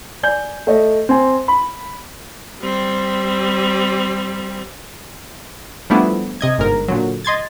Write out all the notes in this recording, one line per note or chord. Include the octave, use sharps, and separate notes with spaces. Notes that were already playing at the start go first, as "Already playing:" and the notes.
D5 G#5 G6
A3 C#5 D#5
C4 G#5
B5
G3 C4
F3 G3 A3 B3 D4 E4
C3 D#5 G#6
G1 G#2 A#4
A#2 D3 F#3
D#5 C6 G#6 A6